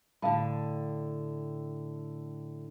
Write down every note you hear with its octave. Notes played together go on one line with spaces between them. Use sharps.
A2 D3 F5 A5 B5